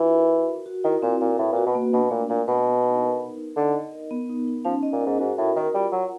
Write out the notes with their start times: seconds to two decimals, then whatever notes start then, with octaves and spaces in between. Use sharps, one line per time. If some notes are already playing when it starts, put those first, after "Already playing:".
Already playing: E3 D4 F4 F#4
0.11 A#4
0.30 F#4
0.49 A#4
0.66 F#4
0.84 D#3 E4
1.02 A#2 C4
1.21 A#2 C4
1.39 A2 B4
1.53 A#2 F#4
1.66 B2
1.75 A#3
1.93 B2 D4
2.11 A#2 A3
2.30 A#2 D4
2.47 B2 B4
2.66 B3
2.84 D#4
3.01 A#4
3.20 A#4
3.38 D#4
3.57 D3 D#5
3.74 D#5
3.93 A#4
4.11 B3
4.30 D#4
4.48 D#4
4.65 F3 C#4
4.83 D#5
4.93 A#2
5.02 G#2 A#4
5.19 G#2 F#4
5.38 A2 A#4
5.56 D#3 A#4
5.74 G3 F4
5.92 F#3 F4